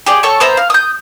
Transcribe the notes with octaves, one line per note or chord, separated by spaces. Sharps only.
G4 G#4 D5
A4 C#5 C#6
B3 C5 E5 A#5
F5
D#6 G6